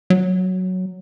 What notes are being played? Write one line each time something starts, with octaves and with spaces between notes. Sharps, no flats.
F#3